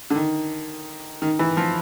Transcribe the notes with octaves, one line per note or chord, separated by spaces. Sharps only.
D3
D#3
D#3
E3
F3